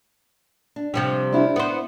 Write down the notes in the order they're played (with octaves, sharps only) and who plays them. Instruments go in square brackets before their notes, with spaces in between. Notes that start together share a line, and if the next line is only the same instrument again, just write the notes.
[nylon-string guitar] D4
[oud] C3 F3 G3
[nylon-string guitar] D4 E4 F4
[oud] B3 C5